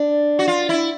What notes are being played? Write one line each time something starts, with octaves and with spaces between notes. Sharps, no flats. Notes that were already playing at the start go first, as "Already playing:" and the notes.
Already playing: D4
F#4
F4
E4